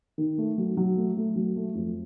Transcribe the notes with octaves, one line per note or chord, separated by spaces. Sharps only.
D#3
A3
F#3
F#3
A3
A3
F#3
A3
F2